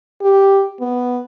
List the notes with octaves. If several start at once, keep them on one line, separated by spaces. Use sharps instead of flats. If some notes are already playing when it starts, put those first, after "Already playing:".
G4
B3